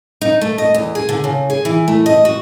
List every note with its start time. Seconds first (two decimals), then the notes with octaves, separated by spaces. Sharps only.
0.21 D#4
0.41 A3
0.58 D#5
0.74 E2
0.95 G#4
1.09 D3
1.24 C#3
1.50 G#4
1.65 E3
1.88 A3
2.06 D#5
2.25 F#4